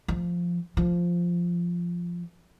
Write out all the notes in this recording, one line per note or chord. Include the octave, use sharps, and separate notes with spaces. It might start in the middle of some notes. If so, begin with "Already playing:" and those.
F3
F3